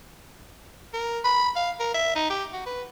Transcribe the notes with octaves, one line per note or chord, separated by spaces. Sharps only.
A#4
B5
F5
A#4
E5
D#4
G4
F#4
B4